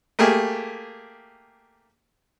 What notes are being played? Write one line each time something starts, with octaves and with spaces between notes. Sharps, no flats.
A3 A#3 G4 G#4